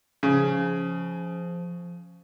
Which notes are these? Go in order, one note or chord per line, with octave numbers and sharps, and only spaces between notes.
C#3 F3